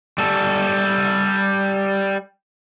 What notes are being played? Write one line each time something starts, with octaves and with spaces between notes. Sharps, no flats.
G3 A4